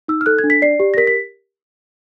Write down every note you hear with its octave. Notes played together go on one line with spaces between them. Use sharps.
D#4 E6
F6
A4 F#6
G#6
D4
B6
D5 C7
G4
A#6
A#4 B6
B6